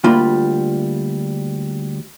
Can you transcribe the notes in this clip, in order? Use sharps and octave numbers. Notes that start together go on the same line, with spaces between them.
D2 G3 A#3 F4 B5